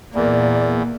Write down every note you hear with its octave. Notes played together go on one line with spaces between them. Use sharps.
E2 A#2 A#3 D5